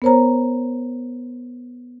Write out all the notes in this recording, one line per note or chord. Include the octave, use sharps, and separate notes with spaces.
B3 A#4 C5 C#5 A#5